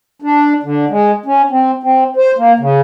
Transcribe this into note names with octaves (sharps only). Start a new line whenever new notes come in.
D4
D3
G#3
C#4
C4
C4
C5
A#3
C#3